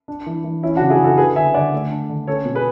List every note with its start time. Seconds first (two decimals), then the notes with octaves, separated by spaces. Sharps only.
0.08 D4
0.26 E3
0.44 E3
0.63 C#4 E4
0.76 D4 F#4
0.81 C#3
0.90 E4 G#4
0.99 C#3
1.04 F#4 A4
1.17 D4 G#4 B4
1.35 D3 E5 G#5
1.54 D3 D5 F#5
1.73 A3
1.91 D4
2.09 D3
2.27 C#4 A4 C#5
2.45 B2
2.55 G#4 B4